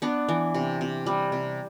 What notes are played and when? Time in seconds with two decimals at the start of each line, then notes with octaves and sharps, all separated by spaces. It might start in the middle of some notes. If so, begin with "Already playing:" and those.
0.02 B3 D4
0.29 E3
0.54 C3
0.81 C3
1.06 G3
1.32 C3